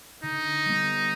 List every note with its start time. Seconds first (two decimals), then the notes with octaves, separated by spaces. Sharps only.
0.23 D3 D#4
0.66 G3 B3